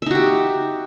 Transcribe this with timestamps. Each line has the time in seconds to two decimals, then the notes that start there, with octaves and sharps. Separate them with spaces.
0.02 E5
0.06 D#4
0.11 F#4
0.15 G4